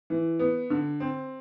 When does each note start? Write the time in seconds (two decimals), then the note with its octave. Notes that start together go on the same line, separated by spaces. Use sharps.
0.10 E3
0.39 B3
0.70 D3
1.00 C4